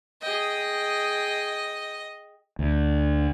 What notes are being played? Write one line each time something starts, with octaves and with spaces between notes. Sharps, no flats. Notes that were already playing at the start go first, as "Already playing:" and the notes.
G#4 D#5 G5
D2